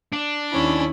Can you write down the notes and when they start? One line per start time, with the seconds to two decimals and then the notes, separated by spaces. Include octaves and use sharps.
0.13 D4
0.52 D#2 C#4 E4 B5